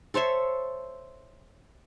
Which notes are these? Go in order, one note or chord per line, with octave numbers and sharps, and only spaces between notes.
A4 C5 C#5 E5